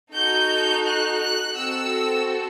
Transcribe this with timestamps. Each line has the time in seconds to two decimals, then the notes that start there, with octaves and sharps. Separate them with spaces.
0.13 D#4 F#4 A4 G6
0.85 F#6
1.21 F#6
1.56 C4 F#4 A4 E6